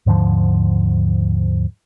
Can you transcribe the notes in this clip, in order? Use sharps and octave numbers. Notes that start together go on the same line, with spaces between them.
D#2 G#2 D3 F3